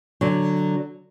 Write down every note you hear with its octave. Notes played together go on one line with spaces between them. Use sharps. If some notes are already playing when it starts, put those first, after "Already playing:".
D3 F#3